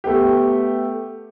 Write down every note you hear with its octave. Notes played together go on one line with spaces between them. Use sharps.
A3 B3 G4